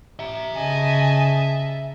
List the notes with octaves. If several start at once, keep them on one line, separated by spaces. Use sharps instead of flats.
E5 A#5
C#3 D#5 G#5 A5